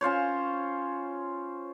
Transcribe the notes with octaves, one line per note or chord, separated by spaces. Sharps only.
C#4 F4 C5 C#5